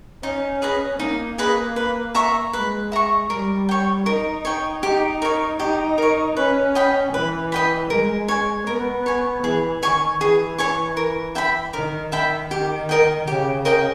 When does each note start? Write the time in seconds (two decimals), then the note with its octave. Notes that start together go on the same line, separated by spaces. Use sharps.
0.23 C#4 D#4
0.62 G#4 B4 D#5
1.00 A#3 D#4
1.38 G#4 B4 D#5
1.76 B4
2.15 E5 A#5 C#6
2.53 G#3 B4
2.92 E5 A#5 C#6
3.30 G3 A#4
3.69 C#5 G5
4.06 D#4 A#4
4.45 C#5 G5
4.83 D#4 G4
5.22 A#4 C#5
5.60 D#4 G4
5.98 A#4 C#5
6.37 C#4 B4
6.75 D#5 G5 B5
7.13 E3 B4
7.52 D#5 G5 B5
7.90 G#3 A#4
8.28 C#5 G#5
8.67 B3 A#4
9.06 C#5 G#5
9.43 E3 G#4
9.83 D#3 C#5 G#5 C#6
10.21 E3 G#4
10.58 C#5 G#5 C#6
10.97 A#4
11.35 E5 G5 B5
11.73 D#3 A#4
12.12 D#3 E5 G5 B5
12.51 D#3 G4
12.89 A#4 D#5 G5
13.28 C#3 G4
13.65 A#4 D#5 G5